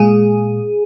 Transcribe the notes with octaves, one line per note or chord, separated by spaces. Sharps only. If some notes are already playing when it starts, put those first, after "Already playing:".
Already playing: A#2 G#3 G#4